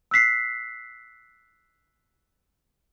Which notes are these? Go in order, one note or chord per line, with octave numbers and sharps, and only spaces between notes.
E6 F#6 B6 C7